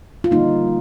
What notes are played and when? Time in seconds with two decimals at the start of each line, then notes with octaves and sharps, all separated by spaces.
0.24 F4
0.31 D3 G3 A#3 D#4